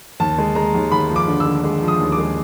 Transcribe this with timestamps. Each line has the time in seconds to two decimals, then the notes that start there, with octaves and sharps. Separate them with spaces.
0.20 D#2 A5
0.38 G#3
0.56 G#3 A#5
0.75 D#2
0.92 D#2 B5
1.10 F3
1.16 D6
1.28 D3
1.40 E6
1.46 D3
1.64 G#3
1.82 F3
1.88 D#6
2.00 D#2
2.12 D6
2.18 G#3